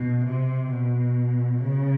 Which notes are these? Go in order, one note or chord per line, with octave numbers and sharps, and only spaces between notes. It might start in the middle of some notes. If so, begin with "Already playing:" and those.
Already playing: B2
C3
B2
C#3